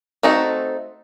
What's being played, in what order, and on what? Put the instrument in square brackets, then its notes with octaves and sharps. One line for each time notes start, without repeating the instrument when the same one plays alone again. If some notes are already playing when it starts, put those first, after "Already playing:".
[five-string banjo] A3 C4 D#4 F#4 A4